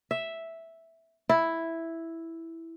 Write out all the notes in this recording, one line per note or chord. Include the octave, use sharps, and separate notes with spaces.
E5
E4